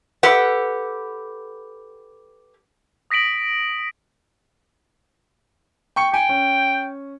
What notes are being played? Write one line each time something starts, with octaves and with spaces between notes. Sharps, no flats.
G4 A4 B4 F#5
D#6 A#6 B6 D7 F#7
G5 C#6 C#7
G5 G#5
C#4